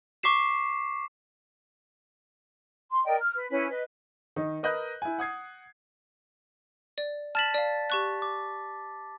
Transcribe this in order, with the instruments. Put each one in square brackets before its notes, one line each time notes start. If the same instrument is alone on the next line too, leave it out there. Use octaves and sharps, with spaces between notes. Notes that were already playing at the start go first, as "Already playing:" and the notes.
[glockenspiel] C#6 D6 B6 C7 E7
[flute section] C6
A#4 D5 D#5 G5
F6
B4
C#4 E4 B4
B4 D#5
[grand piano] D#3 D#4
A#4 B4 D#5 D#6 F#6 G6
E4 G#5
F#5 D#6 G#6 C7
[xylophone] D5
[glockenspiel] A5 A6 B6 [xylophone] F6 E7 F#7
[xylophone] D5 F5
G4 C#6 F#6
[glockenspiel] D6